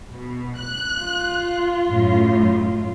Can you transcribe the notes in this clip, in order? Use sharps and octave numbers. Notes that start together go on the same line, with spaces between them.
B2
F#6
F4
F#2 A2